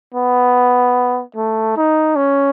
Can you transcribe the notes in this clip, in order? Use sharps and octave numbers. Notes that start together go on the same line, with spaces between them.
B3
A3
D#4
C#4